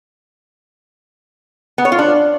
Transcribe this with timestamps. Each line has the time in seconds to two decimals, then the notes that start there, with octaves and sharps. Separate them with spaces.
1.78 B3
1.85 C#5
1.92 F4
1.99 D4